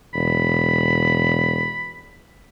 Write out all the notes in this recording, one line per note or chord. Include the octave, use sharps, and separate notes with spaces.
E1 B5